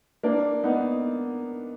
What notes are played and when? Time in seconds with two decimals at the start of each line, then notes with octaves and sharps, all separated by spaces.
0.23 A#3 D4
0.64 B3 D#4